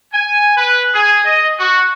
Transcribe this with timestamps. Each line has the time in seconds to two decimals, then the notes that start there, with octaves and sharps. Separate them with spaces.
0.13 G#5
0.57 B4
0.94 G#4
1.24 D#5
1.59 F#4